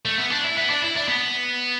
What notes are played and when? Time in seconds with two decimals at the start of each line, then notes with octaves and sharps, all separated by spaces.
0.05 A3
0.18 B3
0.31 D4
0.44 E4
0.57 B3
0.70 D4
0.82 E4
0.96 D4
1.08 B3